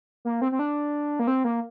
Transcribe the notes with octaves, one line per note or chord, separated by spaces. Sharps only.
A#3
C4
C4
D4
A#3
C4
A#3